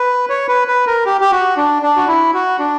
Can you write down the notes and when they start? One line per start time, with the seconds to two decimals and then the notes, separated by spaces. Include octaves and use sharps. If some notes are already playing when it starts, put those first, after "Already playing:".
Already playing: B4
0.29 C#5
0.48 B4
0.68 B4
0.87 A#4
1.06 G4
1.21 G4
1.32 F#4
1.57 D4
1.82 D4
1.96 F#4
2.08 E4
2.34 F#4
2.59 D4